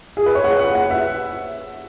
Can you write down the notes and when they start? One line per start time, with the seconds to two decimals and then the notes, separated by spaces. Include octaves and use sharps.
0.17 G#4
0.26 B4
0.35 C#5
0.44 F#5
0.59 F#5
0.75 F#5
0.90 E5